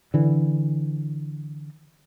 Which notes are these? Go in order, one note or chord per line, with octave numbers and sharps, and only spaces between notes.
D3 E3